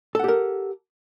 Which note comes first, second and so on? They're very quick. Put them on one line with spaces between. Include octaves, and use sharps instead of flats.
A4 F#5 G4 A#4